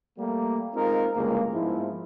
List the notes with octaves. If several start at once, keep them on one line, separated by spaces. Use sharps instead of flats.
G3 A3 A#3
G#3 C4 D#4 F4 A#4
G1 C#2 G#3 A#3
G#2 F3 B3 E4